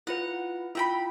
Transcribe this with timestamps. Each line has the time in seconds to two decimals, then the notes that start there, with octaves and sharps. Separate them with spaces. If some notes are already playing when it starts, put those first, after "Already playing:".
0.07 E4 F4 B4 F#5
0.75 E4 F4 E5 G5 B5